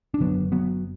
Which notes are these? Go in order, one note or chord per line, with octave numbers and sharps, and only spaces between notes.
D4
F#1 F#2 D3 F#3 B3
F#3 B3